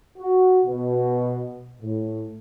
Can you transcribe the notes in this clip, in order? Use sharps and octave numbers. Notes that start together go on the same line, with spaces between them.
F#4
B2
A2